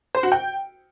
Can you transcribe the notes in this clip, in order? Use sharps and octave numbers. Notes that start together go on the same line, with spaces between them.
C5
F#4
G5